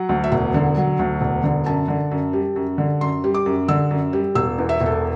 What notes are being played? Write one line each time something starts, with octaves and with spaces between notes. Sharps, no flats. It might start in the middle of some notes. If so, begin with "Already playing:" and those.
Already playing: F#3 F#5
D2
E5
E1 F#5
D3
F#3
D2
E1
D3
F#2 A5
D3
F#2
G3
F#2
D3
F#2 C6
G3
D6
F#2
D3 E6
F#2
G3
E1 E6
E2
E5
E1
A4